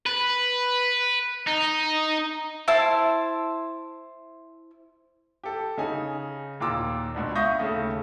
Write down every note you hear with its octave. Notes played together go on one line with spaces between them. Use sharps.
B4
D#4
E4 C5 A5 E6
G4 A4
C#3 D#4 G#5
D#2 A#2 F4 A#5 D6 E6
C#2 B2 D4
E5 F5 C#6 D#6 G6 A#6
D#2 C#3 A3